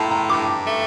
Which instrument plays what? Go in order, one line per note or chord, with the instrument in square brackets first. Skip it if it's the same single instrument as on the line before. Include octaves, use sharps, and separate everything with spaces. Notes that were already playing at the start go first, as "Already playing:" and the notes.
Already playing: [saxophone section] A2 [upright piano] G5 A5 A#5 C6
[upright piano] A#5
[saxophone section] G2 [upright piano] D6
[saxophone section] A3